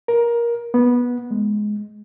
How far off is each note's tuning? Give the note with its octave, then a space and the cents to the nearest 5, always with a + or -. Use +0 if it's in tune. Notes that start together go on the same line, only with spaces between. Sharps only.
A#4 +15
B3 -15
G#3 +10